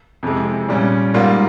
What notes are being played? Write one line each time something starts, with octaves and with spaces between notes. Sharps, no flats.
F2 C3 E3 G#3
A#2 G3 C#4
G#2 G3 A#3 F4